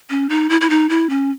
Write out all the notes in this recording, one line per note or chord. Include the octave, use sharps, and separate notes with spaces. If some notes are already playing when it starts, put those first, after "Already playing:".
C#4
D#4
E4
E4
D#4
E4
C#4